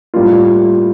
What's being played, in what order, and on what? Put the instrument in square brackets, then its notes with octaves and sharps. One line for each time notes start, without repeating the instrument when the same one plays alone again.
[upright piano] A2 G3 A#3 F4